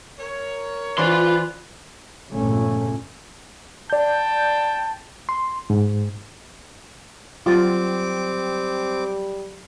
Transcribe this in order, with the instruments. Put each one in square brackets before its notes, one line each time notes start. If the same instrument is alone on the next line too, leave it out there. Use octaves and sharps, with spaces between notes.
[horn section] A#4 C#5
[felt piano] E3 C5 D5 [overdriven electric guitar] F4 C6 [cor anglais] B4
[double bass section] G1 F2 A#2 C#3 A3 C#4
[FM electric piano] D5 G6 [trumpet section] G5 A5
[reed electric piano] C6
G#2
[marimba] F#3 A6 [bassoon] G3 [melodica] C4 D6 [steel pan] F4